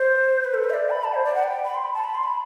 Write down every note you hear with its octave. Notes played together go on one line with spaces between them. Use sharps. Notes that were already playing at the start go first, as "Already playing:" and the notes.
Already playing: C5
B4
A4
B4
E5
D5
B5
A5
C5
D5
F#5
G5
B5
C6
B5
A5
B5
C6
B5